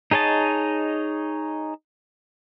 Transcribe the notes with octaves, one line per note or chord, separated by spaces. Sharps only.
D#4 G#4 C#5 D#5 A5